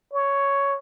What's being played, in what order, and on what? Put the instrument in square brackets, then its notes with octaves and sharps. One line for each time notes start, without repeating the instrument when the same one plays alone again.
[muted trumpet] C#5